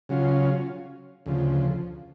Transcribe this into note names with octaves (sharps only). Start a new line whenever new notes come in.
C#3 F#3 C#4 F4
D2 C#3 F3